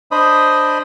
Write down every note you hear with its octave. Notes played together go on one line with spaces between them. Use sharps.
D4 C5 D#5 B5 D#6